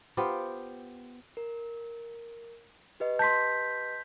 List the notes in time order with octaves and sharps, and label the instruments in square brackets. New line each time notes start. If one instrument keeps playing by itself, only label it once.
[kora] B3 F4 G4 C5
[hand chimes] A#4
G4 B4 D#5
[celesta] A5 C6 [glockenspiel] G6 B6